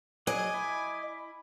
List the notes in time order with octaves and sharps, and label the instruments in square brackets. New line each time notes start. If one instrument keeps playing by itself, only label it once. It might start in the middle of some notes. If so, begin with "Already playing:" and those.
[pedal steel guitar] F#3 G#4 [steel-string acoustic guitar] D#5 [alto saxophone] G#5 [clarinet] D6
[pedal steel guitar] E4